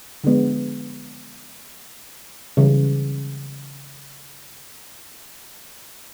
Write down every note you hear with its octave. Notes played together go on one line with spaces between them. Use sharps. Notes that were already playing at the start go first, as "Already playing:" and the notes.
D3 F3 G#3 B3
C#3 E3 G3